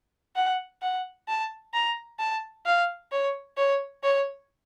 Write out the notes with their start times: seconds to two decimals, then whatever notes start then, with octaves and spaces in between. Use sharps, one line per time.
0.36 F#5
0.82 F#5
1.28 A5
1.74 A#5
2.19 A5
2.66 F5
3.12 C#5
3.57 C#5
4.03 C#5